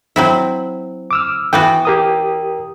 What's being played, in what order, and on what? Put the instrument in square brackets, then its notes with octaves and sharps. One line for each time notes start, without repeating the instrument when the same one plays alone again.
[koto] F#3 C4 E4
[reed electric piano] D6 E6 F6
[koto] E3 B3 F#4 [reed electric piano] G5
[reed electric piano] G4 A#4 D#6